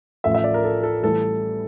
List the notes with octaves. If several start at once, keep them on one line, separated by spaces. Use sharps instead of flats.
A1 A2 F3 A3 E5
E5
D5
A#4
A4
A4
A2 E3 G3 A4